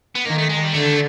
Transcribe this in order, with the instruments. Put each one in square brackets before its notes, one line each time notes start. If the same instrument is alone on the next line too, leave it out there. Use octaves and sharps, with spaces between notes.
[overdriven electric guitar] B3
[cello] D#3 [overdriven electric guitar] A#3
[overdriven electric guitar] A3
G#3
G3
[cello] D3 [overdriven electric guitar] A3